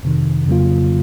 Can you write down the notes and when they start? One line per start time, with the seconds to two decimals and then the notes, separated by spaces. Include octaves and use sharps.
0.03 F2 C3 D#3
0.47 F2 C#3 F#3 A#3 F4